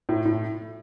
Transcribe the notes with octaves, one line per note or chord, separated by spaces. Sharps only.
A2
A2